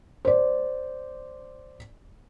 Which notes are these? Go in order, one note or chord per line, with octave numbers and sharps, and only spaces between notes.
C5 D5